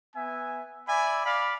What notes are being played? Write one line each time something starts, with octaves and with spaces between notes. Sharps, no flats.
B3 E5 G#5
D5 E5 G#5 B5
D5 F5 B5